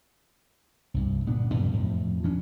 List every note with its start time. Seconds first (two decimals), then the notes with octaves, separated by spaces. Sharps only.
0.94 C2 G2
1.26 G1 A#2 B3 D4
1.54 F#2 C3 F3 G3
1.73 F2 A2
2.23 D2 F3 C#4 D4